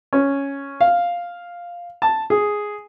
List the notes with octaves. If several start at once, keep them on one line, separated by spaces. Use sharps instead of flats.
C#4
F5
A5
G#4